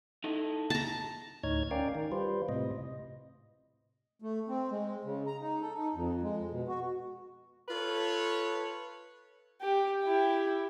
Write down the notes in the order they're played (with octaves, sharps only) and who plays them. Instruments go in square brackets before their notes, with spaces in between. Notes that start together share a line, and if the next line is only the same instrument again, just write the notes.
[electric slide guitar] D#4 E4 A4
[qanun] A5 A#5
[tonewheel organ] D2 A2 D#4 C#5 F6 G#6
C#4 A#4 D5 F5 G5
D#3
G3 F4 B4 C5
A2 C3 D#5
[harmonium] A3
C4
G#3
C#3
A#5
D#4
A4
D#4
F2
G#3
B2
F#4
[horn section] F4 A4 B4 C#5
[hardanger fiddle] G4
E4 G4